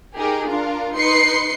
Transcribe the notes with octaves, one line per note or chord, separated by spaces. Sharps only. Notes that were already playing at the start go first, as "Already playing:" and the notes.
D#4 G4 G#4 A#4
D4 F4 A#4
D#4 B4 C6 C7 C#7